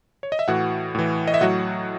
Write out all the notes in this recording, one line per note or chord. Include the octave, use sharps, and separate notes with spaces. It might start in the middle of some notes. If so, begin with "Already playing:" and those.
C#5
D#5
E5
A2 E3 F#4 F#5
A2 E3
D#5
E5
A2 F#3 F#4 F#5